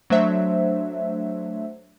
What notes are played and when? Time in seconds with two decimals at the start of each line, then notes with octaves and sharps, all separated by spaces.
0.10 F#3 A3 D4 C5 E5